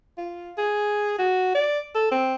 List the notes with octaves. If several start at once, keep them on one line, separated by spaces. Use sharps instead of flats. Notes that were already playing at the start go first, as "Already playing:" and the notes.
F4
G#4
F#4
D5
A4
C4